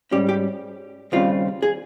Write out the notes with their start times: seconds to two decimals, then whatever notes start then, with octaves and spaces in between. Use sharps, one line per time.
0.11 G#2 G3 C#4 G4
0.29 G4
1.12 D#2 C#3 G3 C4 F4
1.62 G#4